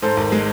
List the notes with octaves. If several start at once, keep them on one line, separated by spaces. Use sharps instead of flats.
G#2 A4 C5
G#1
G#3